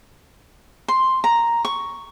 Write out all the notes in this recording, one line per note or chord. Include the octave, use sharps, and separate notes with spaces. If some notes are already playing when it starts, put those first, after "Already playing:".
C6
A#5
C#6